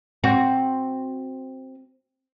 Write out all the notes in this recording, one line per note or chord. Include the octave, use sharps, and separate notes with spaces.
C4 F#4